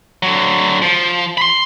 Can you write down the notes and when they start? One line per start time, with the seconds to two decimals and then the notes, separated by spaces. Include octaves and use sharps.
0.23 D3 F#3
0.82 F3
1.38 B5 C6